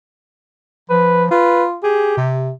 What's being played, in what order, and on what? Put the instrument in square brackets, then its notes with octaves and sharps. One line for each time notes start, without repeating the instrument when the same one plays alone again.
[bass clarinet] F3 [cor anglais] B4
[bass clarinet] F4 [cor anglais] B4
[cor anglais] G4 [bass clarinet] G#4
[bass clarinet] C3